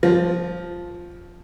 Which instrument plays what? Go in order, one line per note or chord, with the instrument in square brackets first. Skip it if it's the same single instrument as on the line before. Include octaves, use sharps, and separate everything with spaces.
[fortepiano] F3